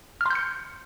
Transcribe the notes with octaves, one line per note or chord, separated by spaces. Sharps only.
C6 F6 G6 C#7